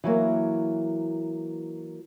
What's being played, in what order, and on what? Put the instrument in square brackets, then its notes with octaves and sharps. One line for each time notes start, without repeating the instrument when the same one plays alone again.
[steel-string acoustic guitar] E3 F#3 A#3